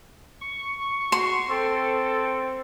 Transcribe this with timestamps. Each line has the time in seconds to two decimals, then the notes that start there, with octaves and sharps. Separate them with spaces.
0.41 C#6
1.12 F#4 C6
1.49 C4 A4